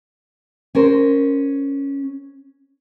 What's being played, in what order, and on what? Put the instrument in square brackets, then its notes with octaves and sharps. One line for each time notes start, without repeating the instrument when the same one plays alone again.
[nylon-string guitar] C#4 A#4 C5